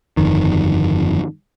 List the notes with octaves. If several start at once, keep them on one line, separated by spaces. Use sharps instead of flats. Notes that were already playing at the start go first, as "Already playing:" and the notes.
G1 F2 D#3